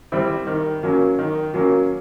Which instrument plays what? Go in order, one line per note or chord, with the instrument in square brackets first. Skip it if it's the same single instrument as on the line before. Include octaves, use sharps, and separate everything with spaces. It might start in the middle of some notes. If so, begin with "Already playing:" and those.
[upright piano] G3 C4 E4
D#3
F#3 A#3 C#4
D#3
F#3 A#3 C#4